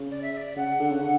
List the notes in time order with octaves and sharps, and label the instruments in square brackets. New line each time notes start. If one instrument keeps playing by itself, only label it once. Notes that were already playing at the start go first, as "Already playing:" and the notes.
Already playing: [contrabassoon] C#3
[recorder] D5
E5
E5
D5
[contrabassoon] C#3 [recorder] F#5
[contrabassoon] D3
C#3
D3